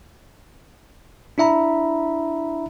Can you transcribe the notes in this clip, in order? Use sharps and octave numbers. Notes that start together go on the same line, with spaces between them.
D4 E4 E5 A#5 B5